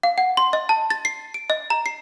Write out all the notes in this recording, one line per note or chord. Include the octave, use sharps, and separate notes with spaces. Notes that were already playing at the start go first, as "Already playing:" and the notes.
F5
F#5
C6
D#5
A5
A6
C7
D7
D#5
A#5
C7